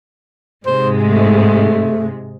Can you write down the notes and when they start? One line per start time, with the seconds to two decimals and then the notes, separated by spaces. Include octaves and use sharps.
0.66 G#2 C3 G#3 C5
1.04 A3